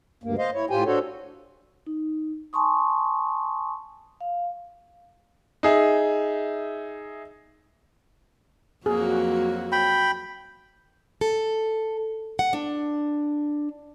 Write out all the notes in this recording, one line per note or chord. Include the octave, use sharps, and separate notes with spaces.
D2 G2 A#3
C5 D#5 F5
E4 C#5
A2 F4 G4 C5 G5 G#5
D4 F#4 A4 C5 C#5
D#4
G#5 A5 C6 C#6 D#6
F5
D#4 G#4 E5
F2 F#3 A#3 F#4 G#4
G5 B5
A4
F#5
D4